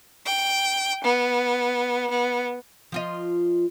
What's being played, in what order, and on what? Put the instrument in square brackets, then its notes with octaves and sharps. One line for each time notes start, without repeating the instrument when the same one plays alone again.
[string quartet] G5
B3
B3
[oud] F3 F4 D#5